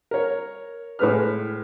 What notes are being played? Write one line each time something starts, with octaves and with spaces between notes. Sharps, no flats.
A#4 C#5
A2 G#3 B4 F6